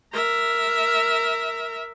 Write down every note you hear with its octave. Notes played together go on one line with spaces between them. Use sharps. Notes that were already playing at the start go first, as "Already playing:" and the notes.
A#4 E5